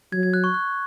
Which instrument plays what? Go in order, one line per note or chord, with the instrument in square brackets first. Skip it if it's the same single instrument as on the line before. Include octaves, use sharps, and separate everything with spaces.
[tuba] F#3 [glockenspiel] G#6
[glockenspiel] G#6
F#6
C#6
F#6